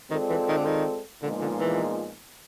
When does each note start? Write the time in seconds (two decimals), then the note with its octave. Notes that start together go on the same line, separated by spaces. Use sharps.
0.11 D#3 G#3 C4 F4 A4 D5
0.30 E3
0.48 D#3
0.57 D3
0.66 D#3
1.23 A#2 D3 F3 G#3 B3 D#4
1.41 D3
1.60 E3